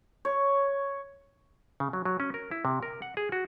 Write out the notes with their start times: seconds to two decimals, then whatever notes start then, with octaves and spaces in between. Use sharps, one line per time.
0.25 C#5
1.80 C#3
1.93 F#3
2.05 F#3
2.20 C#4
2.34 A#4
2.51 E4
2.65 C3
2.83 A#4
3.02 F#5
3.17 G#4
3.32 F#4